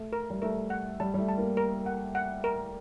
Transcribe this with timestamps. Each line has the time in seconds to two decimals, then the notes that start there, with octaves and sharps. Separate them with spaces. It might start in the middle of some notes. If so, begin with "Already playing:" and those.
Already playing: A3
0.13 A#4
0.30 G3
0.42 A3 A#4
0.70 F#5
1.00 G3 A5
1.14 G3
1.18 A3
1.29 A5
1.38 A#3
1.57 A#4
1.86 F#5
2.15 F#5
2.44 A#4